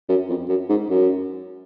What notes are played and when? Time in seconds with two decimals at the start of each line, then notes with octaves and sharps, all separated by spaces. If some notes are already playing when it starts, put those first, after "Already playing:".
0.09 F#2
0.29 F2
0.49 F#2
0.69 G#2
0.89 F#2